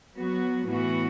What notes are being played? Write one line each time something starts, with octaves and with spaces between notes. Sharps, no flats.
F#3 B3 F#4
A2 E3 B3 F#4